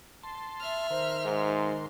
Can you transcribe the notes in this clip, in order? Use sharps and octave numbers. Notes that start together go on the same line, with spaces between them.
A5 C6
E5 F6
D#3 A#4 C5 C6
G#2